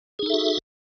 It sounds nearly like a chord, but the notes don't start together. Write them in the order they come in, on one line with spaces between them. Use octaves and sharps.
G#4 D#4 A4 E5 F#4